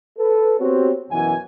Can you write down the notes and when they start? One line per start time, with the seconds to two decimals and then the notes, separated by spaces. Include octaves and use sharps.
0.18 A4 B4
0.59 B3 C4 F#4 G4 C5 C#5
1.10 F#2 B2 E3 F#4 G#5